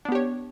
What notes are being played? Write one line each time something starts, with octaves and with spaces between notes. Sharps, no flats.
B3 D4 G4 C#5